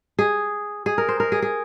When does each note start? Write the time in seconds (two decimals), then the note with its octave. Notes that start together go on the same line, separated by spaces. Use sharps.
0.19 G#4
0.86 G#4
0.98 A#4
1.08 C5
1.20 A#4
1.32 G#4
1.42 G#4